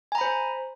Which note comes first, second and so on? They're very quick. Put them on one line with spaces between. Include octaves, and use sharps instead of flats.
G#5 A#5 B5 C5